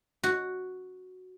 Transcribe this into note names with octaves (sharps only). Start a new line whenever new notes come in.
F#4